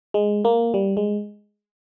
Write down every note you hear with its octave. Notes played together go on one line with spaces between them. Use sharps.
G#3
A#3
G3
G#3